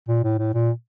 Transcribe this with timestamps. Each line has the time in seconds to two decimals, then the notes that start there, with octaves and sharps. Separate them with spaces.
0.08 A#2
0.24 A2
0.39 A2
0.54 A#2